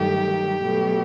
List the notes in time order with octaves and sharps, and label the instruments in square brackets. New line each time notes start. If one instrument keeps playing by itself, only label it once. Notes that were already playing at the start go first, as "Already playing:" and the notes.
Already playing: [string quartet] G2 D#3 F#3 A3 G4
B2 F#3 A3